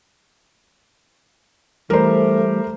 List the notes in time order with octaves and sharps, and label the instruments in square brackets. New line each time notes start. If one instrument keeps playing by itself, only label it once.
[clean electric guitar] E3 G3 [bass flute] A3 [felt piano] A#4 C5